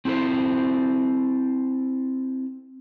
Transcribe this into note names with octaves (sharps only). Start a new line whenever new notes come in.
C4 E4 F4 A4 C5